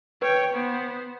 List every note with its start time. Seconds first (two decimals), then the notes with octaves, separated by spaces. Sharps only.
0.22 B4 C#5 G5
0.54 B3 C5